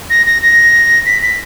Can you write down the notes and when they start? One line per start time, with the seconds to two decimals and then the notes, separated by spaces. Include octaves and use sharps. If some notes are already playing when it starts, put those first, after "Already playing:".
0.10 A#6
0.26 A#6
0.42 A#6
1.06 B6
1.22 B6